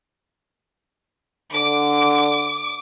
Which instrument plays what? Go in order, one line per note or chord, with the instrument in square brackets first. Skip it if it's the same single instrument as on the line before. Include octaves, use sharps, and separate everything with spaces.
[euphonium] D3 [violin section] D6